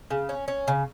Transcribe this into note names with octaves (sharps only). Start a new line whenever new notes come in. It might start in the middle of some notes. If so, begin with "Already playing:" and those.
C#3
C#4
C#4
C#3